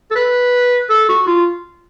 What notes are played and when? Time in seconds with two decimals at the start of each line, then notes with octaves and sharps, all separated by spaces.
0.11 A4
0.16 B4
0.90 A4
1.09 F#4
1.27 F4